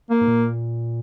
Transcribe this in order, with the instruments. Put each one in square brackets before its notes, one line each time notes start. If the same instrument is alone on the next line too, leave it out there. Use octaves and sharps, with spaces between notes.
[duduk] A#3
[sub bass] G#2
A#2